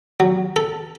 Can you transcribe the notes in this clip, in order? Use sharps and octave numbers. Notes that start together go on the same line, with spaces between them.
F#3
A4